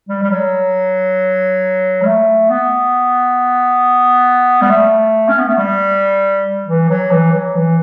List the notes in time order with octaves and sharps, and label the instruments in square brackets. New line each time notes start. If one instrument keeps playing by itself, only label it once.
[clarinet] G3
G3
F#3
G3
A3
B3
G3
A3
C#4
B3
A3
G3
E3
F#3
E3
F#3
E3